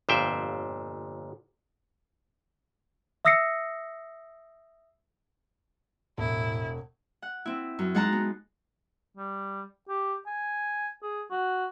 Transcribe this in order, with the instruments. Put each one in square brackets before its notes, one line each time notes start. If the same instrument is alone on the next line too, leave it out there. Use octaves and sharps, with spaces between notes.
[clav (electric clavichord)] G1 F2 A#2 C5 E5 G5
[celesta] E5 D#6 E6 A#6 C7 C#7
[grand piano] E1 [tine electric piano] A2 [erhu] E4
[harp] F#5
C4 E4
F#2
G#3 D#4 F#5 A5 A#5
B3
[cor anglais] G3
G4
G#5
G#4
F#4